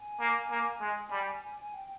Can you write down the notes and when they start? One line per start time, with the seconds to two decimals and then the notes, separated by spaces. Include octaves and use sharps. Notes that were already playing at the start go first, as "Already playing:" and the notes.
Already playing: G#5
0.20 A#3
0.51 A#3
0.80 G#3
1.11 G3
1.73 G5